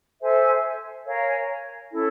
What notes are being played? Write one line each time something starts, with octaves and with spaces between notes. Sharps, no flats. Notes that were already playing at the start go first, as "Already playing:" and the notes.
A4 C5 E5 G#5
A#4 C#5 F5 G#5
C#4 E4 A4